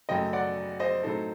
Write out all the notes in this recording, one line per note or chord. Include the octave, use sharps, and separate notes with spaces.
F#1 F#2 F#3 A3 D#5 G5
D5 F#5
C5 D#5
A2 F#3 C4 D#4 A4 C5